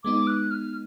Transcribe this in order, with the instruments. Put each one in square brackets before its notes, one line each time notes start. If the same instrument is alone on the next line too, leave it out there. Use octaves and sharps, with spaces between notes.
[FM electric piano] G#3 B3 D#4 [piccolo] D6
[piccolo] F#6
F6